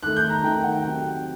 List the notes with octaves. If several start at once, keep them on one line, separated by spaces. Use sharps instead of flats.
D#3 A3 D#4 F#6
G6
A#5
D#3 A3 D#4 G5
F#5
C3 F#3 C4 G5